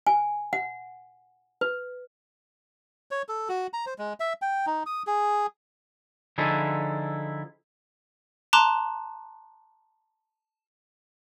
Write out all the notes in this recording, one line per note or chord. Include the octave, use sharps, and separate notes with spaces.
G#5
F#5
B4
C#5
A4
F#4
A#5
C5
G#3
E5
G5
D#4
D#6
G#4
D3 F3 D#4 E4 G#4 A4
A5 A#5 C6 D6 F#6 E7